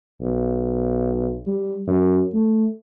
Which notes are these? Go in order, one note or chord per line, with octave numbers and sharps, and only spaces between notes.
B1
G3
F#2
A3